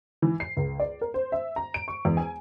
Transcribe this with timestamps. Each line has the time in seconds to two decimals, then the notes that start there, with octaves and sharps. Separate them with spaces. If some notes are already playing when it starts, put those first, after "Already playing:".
0.22 E3
0.40 C7
0.57 C#2
0.80 D5
1.01 A#4
1.14 C5
1.32 E5
1.56 A#5
1.74 D7
1.88 C#6
2.05 E2
2.17 G#5